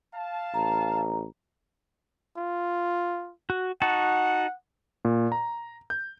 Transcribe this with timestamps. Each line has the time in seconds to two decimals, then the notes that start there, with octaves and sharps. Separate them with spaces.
0.15 F5 A5
0.54 A1 A#5
2.38 F4
3.50 F#4
3.82 D#4 F#4 F#5 A5
5.05 A#2
5.32 A#5
5.90 G6